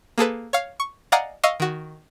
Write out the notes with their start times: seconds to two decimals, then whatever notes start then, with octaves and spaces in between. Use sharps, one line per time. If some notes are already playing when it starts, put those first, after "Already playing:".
0.18 A#3 G#4 A4 B4
0.53 C#5 F5
0.80 C#6
1.12 D5 D#5 F5 F#5 G#5 A#5
1.44 D#5 F5 C#6 E6
1.60 D#3 F#4